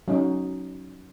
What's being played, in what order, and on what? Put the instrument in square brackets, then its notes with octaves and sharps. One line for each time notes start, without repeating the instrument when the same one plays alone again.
[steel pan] F#3 C#4 D#4